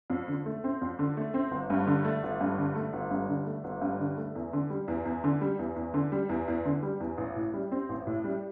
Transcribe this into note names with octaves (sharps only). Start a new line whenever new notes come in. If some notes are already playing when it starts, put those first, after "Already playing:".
F2
D3
A3
C4
F2
D3
A3
C4
G1
G2
D3
A3
G1
G2
D3
A3
G1
G2
D3
A3
G1
G2
D3
A3
E2
D3
G3
E2
E2
D3
G3
E2
E2
D3
G3
E2
E2
D3
G3
E2
A1
A2
G3
C4
A1
A2
G3